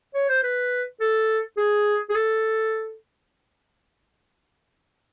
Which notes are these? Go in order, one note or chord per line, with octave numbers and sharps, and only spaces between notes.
C#5
C5
B4
A4
G#4
G#4
A4